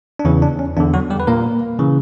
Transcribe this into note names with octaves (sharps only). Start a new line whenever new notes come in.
D4
E2 C#3 E3 C#4
D4
C#4
E2 D3 D4
F#3 F#4
G3 G4
B4
A#2 A#3 A#4
C#3 E3